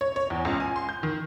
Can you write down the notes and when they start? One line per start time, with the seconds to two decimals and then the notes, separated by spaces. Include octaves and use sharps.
0.01 C#5
0.16 C#5
0.30 E2
0.45 C#2
0.60 G#5
0.76 C6
0.89 G6
1.03 D#3